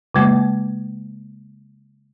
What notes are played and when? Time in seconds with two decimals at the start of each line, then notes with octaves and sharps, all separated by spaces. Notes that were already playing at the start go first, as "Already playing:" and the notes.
0.15 C#3 G#3 A#3